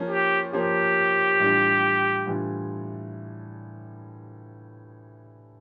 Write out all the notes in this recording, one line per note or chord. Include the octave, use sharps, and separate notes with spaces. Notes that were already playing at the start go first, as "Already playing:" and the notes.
Already playing: F3 A#3 C#4
G4
F3 A#3 C#4 G4
A2 E3 G3 D4 F4
A2 E3 G3 D4 F4